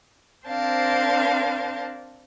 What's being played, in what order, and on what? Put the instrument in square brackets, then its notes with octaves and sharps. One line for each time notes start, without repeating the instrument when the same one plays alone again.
[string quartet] C4 D4 A#4 C5 F5 A5